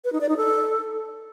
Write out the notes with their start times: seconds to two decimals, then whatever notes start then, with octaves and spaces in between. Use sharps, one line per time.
0.04 B4
0.13 D#4
0.21 D5
0.29 D#4
0.37 A4